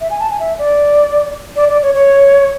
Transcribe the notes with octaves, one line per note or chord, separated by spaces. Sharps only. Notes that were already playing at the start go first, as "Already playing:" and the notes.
E5
G#5
A5
G#5
E5
D5
D5
D5
C#5
C#5